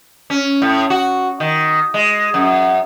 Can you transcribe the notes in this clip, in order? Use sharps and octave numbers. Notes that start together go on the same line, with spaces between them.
C#4
A2
F#4
D#3
G#3
F#2